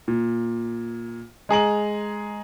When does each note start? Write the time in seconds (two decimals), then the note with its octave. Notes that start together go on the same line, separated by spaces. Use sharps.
0.08 A#2
1.49 G#3 G#4 A#5 F#7